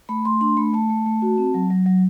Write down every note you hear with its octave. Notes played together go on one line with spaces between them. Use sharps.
A3 B5
A3 C6
D4 C6
A3 B5
A3 A5
A3
A3
F#4
C4
F#3
F#3
F#3